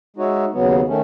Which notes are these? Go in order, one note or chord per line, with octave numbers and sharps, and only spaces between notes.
G#3 D#4 F#4 C#5 E5
D#2 C#3 F#3 B3
D#3 A3 C#4